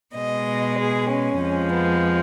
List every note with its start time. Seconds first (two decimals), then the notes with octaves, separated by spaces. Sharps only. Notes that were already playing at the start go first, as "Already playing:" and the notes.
0.15 B2 G#3 D#5
0.78 G#4
1.09 C#4
1.40 F2 F3 G#3
1.72 B3